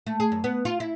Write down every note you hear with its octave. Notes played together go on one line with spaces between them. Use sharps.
A3
G#4
F#2
B3
F4
E4